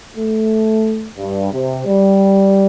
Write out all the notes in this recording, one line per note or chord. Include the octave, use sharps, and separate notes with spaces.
A3
G2
C3
G3